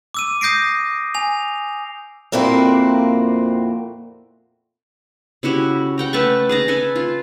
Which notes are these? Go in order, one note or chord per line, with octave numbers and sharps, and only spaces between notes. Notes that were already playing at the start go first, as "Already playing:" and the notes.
D6 E6 D#7
D#6 G6 A#6 C7 D7
G#5 F7
F2 A#2 A#3 C4 E4 F#4
C#3 E4 F#4 G4
F#5 G5 A#5
A3 B4 A5 C#6
G#4 A5 A#5
A4 B4 E5 G#5
F4